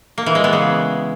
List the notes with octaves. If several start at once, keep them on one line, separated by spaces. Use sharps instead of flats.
A#3
E3
G#3
B3
C#3